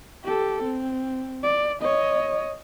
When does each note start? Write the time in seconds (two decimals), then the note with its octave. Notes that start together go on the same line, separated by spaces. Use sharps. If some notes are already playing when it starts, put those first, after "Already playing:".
0.24 G4 A4
0.63 C4
1.44 D5
1.82 C#5 D#5